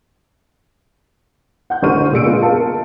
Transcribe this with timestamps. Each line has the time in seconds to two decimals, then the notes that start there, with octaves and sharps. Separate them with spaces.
1.70 F#5 G6
1.82 A1 D3 C5 C#6 F6 D#7
2.12 A#2 G#4 E6 C#7 D7
2.25 G#3 A#3 B3 F4
2.42 G#4 A#4 F5 A5